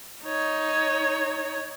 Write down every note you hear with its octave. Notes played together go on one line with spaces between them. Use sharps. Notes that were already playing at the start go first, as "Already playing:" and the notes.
D#4 C#5